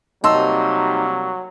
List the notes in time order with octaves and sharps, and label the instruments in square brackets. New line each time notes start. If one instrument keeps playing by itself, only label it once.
[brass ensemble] C3 G3 A#3 [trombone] F#3 [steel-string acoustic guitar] D#4 [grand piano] A5 C6 E6